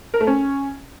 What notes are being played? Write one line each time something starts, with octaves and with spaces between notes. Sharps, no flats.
A#4
A3
C#4